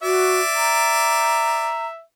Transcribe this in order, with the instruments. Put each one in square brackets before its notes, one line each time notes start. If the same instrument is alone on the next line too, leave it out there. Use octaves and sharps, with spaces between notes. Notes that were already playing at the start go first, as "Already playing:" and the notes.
[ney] F#4 [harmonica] D5 [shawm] E5
[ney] A#5